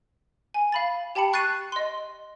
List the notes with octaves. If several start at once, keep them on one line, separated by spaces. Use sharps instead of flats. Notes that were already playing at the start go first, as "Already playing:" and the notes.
G#5
F5 B5 A6
G4 G5 A5 B5 C#7
C#6 F#6 A6 C7 D#7
D#5 C6